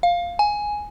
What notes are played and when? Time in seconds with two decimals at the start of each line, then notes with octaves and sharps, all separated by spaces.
0.03 F5
0.39 G#5